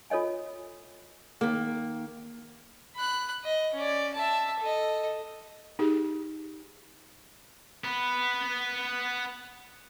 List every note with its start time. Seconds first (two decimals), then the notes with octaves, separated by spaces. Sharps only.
0.10 F4 A4 C#5 D#5 G#5
1.41 D#3 A#3
2.95 B5 F#6
3.44 D#5
3.74 C#4 D5
4.14 E5 A5
4.60 A4 D#5
5.79 D#4 G4 G#4
7.84 B3 B4